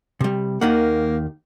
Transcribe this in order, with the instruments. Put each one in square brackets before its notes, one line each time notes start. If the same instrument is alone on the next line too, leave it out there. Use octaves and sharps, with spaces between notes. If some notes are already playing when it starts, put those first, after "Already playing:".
[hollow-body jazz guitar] C3 G3
[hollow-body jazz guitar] D#2 D#3 F#5 [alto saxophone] A#3